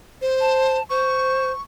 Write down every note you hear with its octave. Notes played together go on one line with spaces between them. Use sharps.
C5
A5
C5 C#6